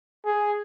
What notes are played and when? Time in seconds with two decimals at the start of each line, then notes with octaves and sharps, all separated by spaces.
0.25 G#4